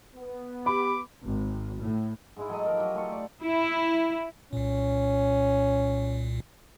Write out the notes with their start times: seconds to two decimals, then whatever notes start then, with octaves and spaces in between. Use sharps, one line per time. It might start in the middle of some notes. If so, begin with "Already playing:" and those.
0.16 B3
0.66 G4 B5 D6
1.24 G#1
1.81 A2
2.36 G#2 G#3 E4
2.49 F#3 A4 D#5
2.66 F3 A#4
2.77 F#3 G4
2.95 A3 F4 C#6
3.12 D5
3.43 E4
4.53 C2 A#2 C#4